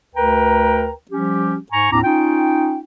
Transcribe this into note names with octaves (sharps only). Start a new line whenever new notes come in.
D2 A#4 B4 G5 A#5
F3 G3 C#4 G4
G#2 G#5 A#5 C#6
D#2 A2 C4 D4 A#5 D6
C#4 D#4 F4 G5